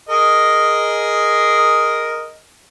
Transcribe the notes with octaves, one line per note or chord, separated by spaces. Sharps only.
G#4 A#4 D#5